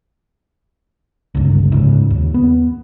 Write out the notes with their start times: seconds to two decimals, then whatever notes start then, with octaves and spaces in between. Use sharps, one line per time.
1.35 G1 C#2
1.72 G#2 C#3
2.10 D#2
2.34 B3